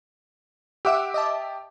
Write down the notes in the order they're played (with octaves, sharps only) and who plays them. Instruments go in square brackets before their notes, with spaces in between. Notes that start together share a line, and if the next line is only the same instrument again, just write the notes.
[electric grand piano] G4 D6 [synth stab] E5 F#5 E6
[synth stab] D#5 E5 A5